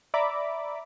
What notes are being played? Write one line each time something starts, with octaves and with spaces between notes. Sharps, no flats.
D5 E5 A#5 B5 D6